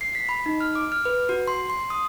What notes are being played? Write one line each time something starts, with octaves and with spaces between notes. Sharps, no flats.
C7
B6
B5
D#4
F6
D6
F6
B4
F#4
C6
C6
D#6